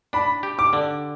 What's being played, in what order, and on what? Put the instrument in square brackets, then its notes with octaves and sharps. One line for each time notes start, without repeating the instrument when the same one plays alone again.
[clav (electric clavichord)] D4 [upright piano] B5
[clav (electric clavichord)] G4
[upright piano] D6
[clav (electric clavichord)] D3